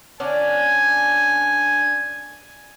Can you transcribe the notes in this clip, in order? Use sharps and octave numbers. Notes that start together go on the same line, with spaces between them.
D3 C#4 D4 G#5